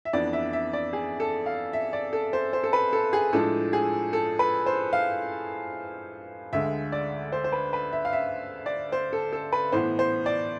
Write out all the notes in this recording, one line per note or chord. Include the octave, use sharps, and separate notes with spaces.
E5
F2 E3 B3 D4 D5
E5
E5
D5
G#4
A4
F5
E5
D5
A4
C5
C5
A4
B4
A4
G#4
A2 F3 G#3 D4 A4
G#4
A4
B4
C5
F5
D2 D3 G#3 E5
D5
C5
C5
B4
B4
E5
F5
E5
D5
C5
A4
A4
B4
A2 E3 B3 C5
C5
D5